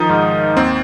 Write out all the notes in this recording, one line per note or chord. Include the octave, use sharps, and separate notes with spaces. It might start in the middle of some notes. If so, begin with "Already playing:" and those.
Already playing: D#3 F3 D#4
G#2
D#2 C4